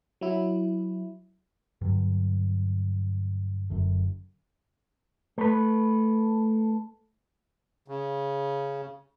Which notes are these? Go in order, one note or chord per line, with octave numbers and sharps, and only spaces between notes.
F#3 E4
G2 D3 F#3
F#1 F#2 D3
A3 B4
C#3